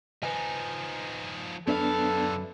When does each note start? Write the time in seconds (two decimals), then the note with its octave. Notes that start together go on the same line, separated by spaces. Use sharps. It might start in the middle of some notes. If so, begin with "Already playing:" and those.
0.23 F3 D#4 B4 G#5
1.68 F#2 D3 B3 D4 A4 B4 E5 F5